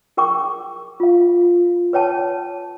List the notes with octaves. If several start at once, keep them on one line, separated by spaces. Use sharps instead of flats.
G#4 A#4 G5 C#6 D6
F4 F5
B4 C#5 G5 A5